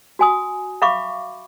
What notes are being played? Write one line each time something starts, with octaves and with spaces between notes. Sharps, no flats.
F#4 G#5 D#6
E5 F5 B5 C#6 D6